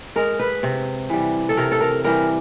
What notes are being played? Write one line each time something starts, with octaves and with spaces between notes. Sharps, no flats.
G#3 A#4
B4
C3
E3 G3
A4
C3 A#4
A4
A#4
E3 G3 A#4